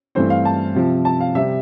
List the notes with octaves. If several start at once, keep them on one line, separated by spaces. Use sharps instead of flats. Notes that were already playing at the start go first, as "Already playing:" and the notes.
G2 E3 A3 C4 C5
F5
A5
C3 F3 C4
A5
F5
C3 G3 C4 E5